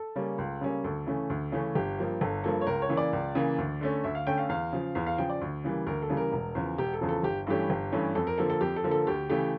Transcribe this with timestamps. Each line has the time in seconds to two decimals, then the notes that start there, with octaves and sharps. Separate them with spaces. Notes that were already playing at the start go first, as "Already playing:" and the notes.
Already playing: A4
0.16 C#3 G3 A#3 C#4
0.38 C#2
0.61 C#3 G3 A#3 C#4
0.84 D2 A4
1.07 C#3 E3 A3 C#4
1.30 D2
1.52 C#3 E3 A3 C#4
1.75 G1 G4
1.99 G2 F3 A#3
2.21 G1 A4
2.44 G2 F3 A#3 A4
2.61 C#5
2.67 C#2 A#4
2.82 C#5
2.89 C#3 E3 A#3
2.97 D5
3.13 C#2
3.35 C#3 E3 A#3
3.58 D2
3.81 D3 A3 C#4
4.04 D2 E5
4.15 F5
4.26 D3 A3 C#4 G5
4.38 F5
4.49 E2 F5
4.73 C#3 F3
4.95 E2 F5
5.06 F5
5.18 C#3 F3 G5
5.30 D5
5.41 D2
5.64 C#3 E3 G3 A#3
5.86 D2 A#4
6.02 A4
6.09 C#3 E3 G3 A#3
6.17 A#4
6.32 E1
6.55 E2 C#3 F3
6.78 E1 G4
6.94 A4
7.01 E2 C#3 F3
7.09 A4
7.23 G1 G4
7.47 G2 E3 A3 C#4 G4
7.70 G1
7.92 G2 E3 A3 C#4
8.15 F2 A4
8.27 A#4
8.38 D3 F3 A#3 A4
8.50 A4
8.61 F2 G4
8.76 A4
8.84 D3 F3 A#3
8.91 A4
9.07 D2 G4
9.29 C#3 E3 A3 G4